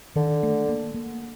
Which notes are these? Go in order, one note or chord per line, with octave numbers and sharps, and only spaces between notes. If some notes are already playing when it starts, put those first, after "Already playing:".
D3 D#3
A3
A#3
A#3